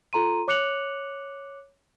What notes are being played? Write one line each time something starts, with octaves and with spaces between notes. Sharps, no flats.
F4 A4 A#5 C6 D#7
C#5 D6 F#6 C#7 F7 F#7